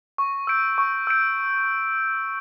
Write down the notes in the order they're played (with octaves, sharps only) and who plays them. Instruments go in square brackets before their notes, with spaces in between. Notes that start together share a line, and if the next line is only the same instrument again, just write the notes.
[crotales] C#6
E6 G6 D7
C#6
E6 G6 D7